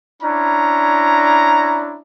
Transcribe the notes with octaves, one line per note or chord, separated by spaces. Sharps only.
C#4 D4 E4 A#5